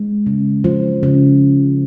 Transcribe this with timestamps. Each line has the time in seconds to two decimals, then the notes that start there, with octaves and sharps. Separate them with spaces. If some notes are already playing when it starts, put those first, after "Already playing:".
Already playing: G#3
0.26 C#3
0.64 F3
1.03 C#3